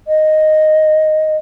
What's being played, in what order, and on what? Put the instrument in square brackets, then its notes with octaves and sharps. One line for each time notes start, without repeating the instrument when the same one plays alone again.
[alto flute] D#5